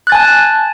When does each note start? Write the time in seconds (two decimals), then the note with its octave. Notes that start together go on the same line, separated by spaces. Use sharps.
0.07 F#6
0.10 A6
0.12 G#5
0.15 A5